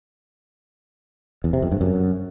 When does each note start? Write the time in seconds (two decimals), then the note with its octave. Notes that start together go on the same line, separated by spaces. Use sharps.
1.44 E2
1.53 C3
1.62 F2
1.72 G2
1.81 F#2